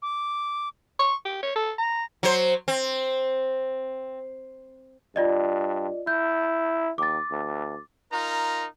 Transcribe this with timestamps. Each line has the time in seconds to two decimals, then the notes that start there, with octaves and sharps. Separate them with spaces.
0.02 D6
0.99 C#6
1.25 G4
1.43 C#5
1.56 A4
1.78 A#5
2.23 F#3 C5
2.68 C4
5.16 G2 F4 D5 D#5
6.07 E4 G6
6.98 D#2 D6 A6
7.31 D2
8.13 D#4 F4 A#4 A#5